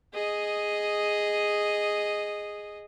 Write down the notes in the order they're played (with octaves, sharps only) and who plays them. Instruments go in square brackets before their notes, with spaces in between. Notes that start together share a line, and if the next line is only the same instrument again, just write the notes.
[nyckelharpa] G#4 D#5